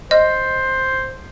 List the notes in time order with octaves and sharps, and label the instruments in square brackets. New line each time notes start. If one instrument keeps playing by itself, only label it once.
[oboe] C5 [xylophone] D#5